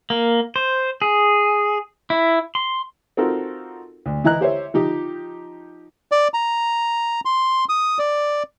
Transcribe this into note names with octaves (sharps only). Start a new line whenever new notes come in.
A#3
C5
G#4
E4
C6
C4 D#4 F4 F#4 A4 A#4
D2
E3 E4 D#5 A#5 F#6
G4 C5 C#5 E5
F3 D#4 G4
D5
A#5
C6
D#6
D5